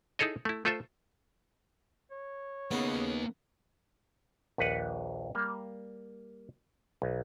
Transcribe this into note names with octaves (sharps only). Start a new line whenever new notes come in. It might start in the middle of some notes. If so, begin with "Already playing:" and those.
D#4 E4 G#4 A4 C#5 D#5
A3 E4
A3 F4 A4 C5 E5
C#5
C#3 A#3 B3 D#4
A#1 D#2 B4 F#5
G3 A#3
B1